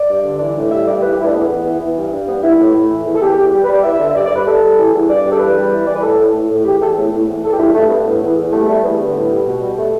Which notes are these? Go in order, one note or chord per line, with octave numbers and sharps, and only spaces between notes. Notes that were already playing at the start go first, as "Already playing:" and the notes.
Already playing: D5
G2
D3
E3 D5
A2
G3 E5
G2 D5
E3 B4
G4
A2 E4
D4
E2 B3
E2
E3
E3
G2
G2
G3 B3
G2 E4
A2
A2
E3
E2
A4
E2 G4
E2
G3 G4
B4
G3
D5
E2 E5
D3
E5
G2 D5
D5
G2 B4
G3 A4
G3
E3
E2
G2 D5
G2
A4
E2 B4
G3
E3
E3 D5
B4
A2 A4
A2
A2
A2
E2 G4
E2 A4
A2
A2
E2
E2 A4
G4
G2 E4
G2 A3
G3 B3
A2
E2
E2
G3 A3
G3 A3
E2 B3
D3
A2
G3
B2
G3
A3